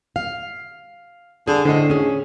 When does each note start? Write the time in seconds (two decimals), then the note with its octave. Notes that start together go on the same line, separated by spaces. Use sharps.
0.16 F5
1.48 D3 G#4
1.65 A2 D3 C5 D#5
1.90 C#4 G#4